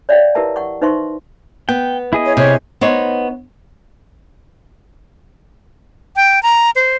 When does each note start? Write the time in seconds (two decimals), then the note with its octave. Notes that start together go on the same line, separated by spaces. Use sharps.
0.09 C#5 D5 E5 F5 G5
0.35 E4 G4 A#4 B4 E5 A5
0.56 F#5 C#6
0.81 D#4 B4 C5 E5 C6 C#6
1.69 B3 G5
2.13 E4 G#4 D#5
2.25 C#5
2.37 C3 C#5
2.81 B3 D#4 C5 C#5
6.16 G5
6.43 A#5
6.76 C5